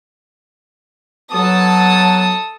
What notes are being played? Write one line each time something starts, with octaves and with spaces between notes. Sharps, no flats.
F#3 B3 A4 A5 D#6